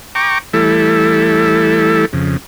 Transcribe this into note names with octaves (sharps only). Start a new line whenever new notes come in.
G5 A#5 C#6 D6
E3 G3 A3 E4 A4
F2 C#3